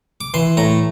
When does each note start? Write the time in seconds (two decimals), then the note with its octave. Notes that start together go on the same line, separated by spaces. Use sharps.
0.21 D6
0.34 E3 C6
0.57 A2 A#5